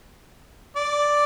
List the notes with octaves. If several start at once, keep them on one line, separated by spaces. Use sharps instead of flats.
D5